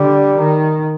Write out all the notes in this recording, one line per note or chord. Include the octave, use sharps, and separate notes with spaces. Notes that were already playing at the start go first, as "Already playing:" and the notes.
Already playing: D3 G3
D#3